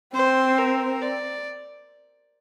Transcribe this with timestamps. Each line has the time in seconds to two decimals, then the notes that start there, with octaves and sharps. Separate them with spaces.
0.15 C4 C5
0.58 A#4
1.01 D5